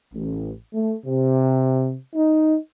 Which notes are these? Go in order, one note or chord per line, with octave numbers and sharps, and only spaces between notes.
A1
A3
C3
D#4